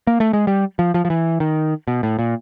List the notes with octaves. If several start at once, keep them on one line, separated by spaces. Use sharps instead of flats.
A#3
A3
G#3
G3
F3
F3
F3
E3
D#3
B2
A2
A#2